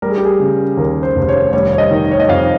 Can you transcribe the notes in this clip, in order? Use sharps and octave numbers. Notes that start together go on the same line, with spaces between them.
G3 A#4
G#4
G4
G#4
C#3
D#2 A#4
C5
F1
C5
C#5
G3 C#5
C#5
D#5
D#3
C#5
D#5
F2 F5